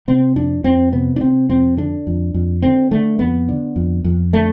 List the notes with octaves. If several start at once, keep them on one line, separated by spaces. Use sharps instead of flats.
C3 C4
F2 D4
F2 C4
C3 B3
D4
C3 C4
F2 C4
D3 D4
F2
F2
D3 C4
D3 A3
F2 B3
D3
F2
F2
D3 A3